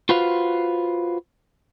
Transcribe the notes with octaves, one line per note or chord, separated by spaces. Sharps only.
F4 F#4 B4 C5 F5